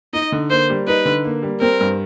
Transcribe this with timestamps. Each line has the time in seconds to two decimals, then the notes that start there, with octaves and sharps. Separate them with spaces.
0.13 D#4 D#5
0.32 D3
0.50 A#3 C5
0.69 G3
0.87 D#4 B4
1.05 D3
1.24 A#3
1.42 G3
1.61 C4 A#4
1.81 G2